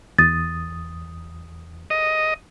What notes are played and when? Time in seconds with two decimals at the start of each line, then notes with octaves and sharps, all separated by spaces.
0.18 E2 D#6 A6
1.90 D#5